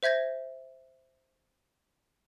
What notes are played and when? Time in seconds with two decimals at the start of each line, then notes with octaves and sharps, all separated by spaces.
0.03 C5 E5 G6 G#6 A#6